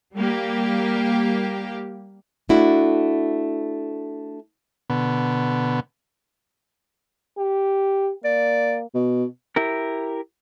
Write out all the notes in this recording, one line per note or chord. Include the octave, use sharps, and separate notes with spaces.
G3 A#3 G4
A3 D4 E4 F#4
B2 D3 B3
G4
A#3 D5
B2
E4 G4 A#4